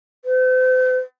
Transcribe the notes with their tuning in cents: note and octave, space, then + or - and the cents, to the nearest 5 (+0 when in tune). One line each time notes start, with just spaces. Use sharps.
C5 -40